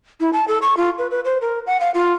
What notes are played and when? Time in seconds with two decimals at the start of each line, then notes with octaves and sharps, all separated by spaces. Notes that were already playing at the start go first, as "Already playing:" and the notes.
0.20 E4
0.33 A5
0.48 A4
0.62 C#6
0.77 F4
0.98 B4
1.11 B4
1.25 C5
1.41 A#4
1.67 F#5
1.80 F5
1.94 F4